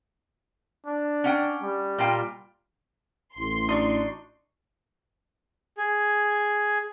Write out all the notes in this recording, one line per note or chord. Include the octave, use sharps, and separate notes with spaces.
D4
C#4 F#5 G5
G3
A#2 F4 G5
A1 C6
D4 D#4 F#4 D5 C#6
G#4